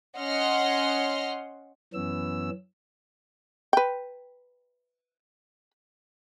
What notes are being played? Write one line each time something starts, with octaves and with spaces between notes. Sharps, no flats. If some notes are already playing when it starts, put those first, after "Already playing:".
C#4 D#5 F#5 C6 F6
F#2 E3 B3 C#4 E6
B4 G5